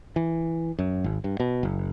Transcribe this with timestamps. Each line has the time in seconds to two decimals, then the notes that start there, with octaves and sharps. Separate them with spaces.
0.16 E3
0.79 F#2
1.04 G#1
1.24 G2
1.40 B2
1.63 F#1